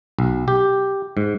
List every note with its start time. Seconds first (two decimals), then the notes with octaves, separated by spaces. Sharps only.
0.19 B1
0.48 G4
1.17 G#2